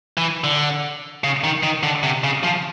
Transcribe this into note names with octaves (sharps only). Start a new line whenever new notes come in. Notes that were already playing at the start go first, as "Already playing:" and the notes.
E3
D3
C#3
D#3
D#3
D3
C3
C#3
F3